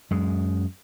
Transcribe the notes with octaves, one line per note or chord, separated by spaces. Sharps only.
F#2 G#3